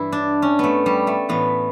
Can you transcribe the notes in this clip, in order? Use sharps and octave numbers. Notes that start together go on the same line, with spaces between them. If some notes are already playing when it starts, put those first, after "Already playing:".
Already playing: G2 E3 E4
D4
C#4
A3 B3
G3
A3
A2 E3 B3